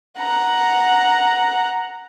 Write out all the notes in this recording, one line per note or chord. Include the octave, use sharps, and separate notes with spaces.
F#5 A#5